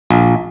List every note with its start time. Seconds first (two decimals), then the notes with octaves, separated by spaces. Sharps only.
0.11 A#1